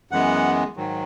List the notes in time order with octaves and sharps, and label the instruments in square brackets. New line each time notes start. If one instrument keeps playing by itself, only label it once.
[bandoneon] F#2 E3 G#3 B3 F#5
G#2 D#3 F#3